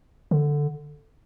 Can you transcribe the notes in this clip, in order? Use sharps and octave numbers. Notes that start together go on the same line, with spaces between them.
D3